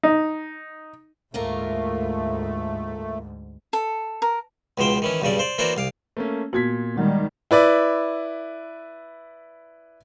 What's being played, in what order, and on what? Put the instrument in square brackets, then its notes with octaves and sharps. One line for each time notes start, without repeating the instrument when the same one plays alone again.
[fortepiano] D#4
[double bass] D2 G#2 [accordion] A3 [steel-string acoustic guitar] A#3 F4 A#4
[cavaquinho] A4
A#4
[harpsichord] C#2 B2 F3 C5 G5
D#3 E3 C#4
B1 G2 C#3 G3 D5
C5 D5
E3 A#3 D4 F#4 C5 D5
C2 F5 D6
[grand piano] A3 A#3 C#4
[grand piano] A#2 G#6 B6 [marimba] B3 F#4
[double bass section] D#3 G3 [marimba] G#3
[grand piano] E4 B4 D5